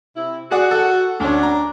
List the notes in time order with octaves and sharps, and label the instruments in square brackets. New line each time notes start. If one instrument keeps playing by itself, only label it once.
[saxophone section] C3 E4
[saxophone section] F#4 [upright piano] G#4 D5 F#5
[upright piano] A4 F#5
[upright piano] D2 C#4 [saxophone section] D4
[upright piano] A#5